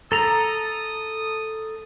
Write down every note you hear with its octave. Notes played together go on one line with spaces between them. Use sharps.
A4 A#5 D#6